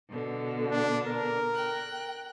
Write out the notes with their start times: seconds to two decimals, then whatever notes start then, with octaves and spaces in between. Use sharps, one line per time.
0.10 B2 D3
0.71 D4
1.07 A#4
1.53 G5 F#6